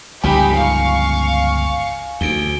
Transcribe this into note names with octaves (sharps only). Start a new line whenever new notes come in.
G1 C#2 F3 D#4 G4 G#5 B5
F5 C#6
D2 D7 G7